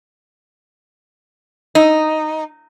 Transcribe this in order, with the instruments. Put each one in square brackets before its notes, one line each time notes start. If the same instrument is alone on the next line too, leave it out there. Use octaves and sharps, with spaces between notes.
[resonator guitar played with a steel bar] D#4